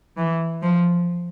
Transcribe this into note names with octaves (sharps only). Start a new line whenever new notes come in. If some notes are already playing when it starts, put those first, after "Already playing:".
E3
F3